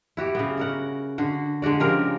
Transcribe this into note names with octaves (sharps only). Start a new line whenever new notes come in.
E4 F#4 G4
C#3 B3
F#4 A#4 F#5
D3 F#4
D3 G#3 F#4 D5
C#3 F3 G4 A#4